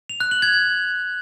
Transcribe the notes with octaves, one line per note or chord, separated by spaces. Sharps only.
F7
F#6
F#7
G#6
G#6